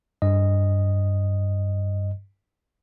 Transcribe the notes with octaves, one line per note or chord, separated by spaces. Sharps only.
G2 D#5